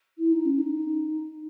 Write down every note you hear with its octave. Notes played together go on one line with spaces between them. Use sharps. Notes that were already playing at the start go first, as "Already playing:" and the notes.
E4
D#4
C#4
D#4